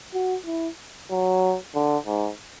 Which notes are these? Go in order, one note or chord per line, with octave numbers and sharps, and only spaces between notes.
F#4
E4
F#3
D3
G#2